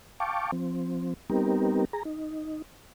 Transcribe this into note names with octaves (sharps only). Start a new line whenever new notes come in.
F5 G5 A5 C#6 D6
F3 C4
G3 B3 C4 D#4 G4 A#4
G#4 A#5
D#4